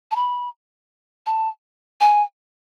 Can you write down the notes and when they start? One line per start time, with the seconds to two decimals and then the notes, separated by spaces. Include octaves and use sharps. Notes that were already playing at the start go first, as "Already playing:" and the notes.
0.11 A5
0.16 B5
1.26 A5
2.01 G#5